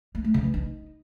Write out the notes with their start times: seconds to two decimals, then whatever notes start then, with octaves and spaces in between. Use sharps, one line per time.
0.15 A#3
0.24 A3
0.34 C#3
0.44 E3
0.54 D#4